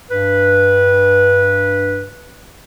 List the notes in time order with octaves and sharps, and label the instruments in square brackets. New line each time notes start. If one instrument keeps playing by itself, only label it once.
[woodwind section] G2 B4